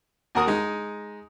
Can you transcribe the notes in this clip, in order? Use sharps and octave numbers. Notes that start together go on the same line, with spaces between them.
D#2 F#4 A#4 D#6
G#3 D#4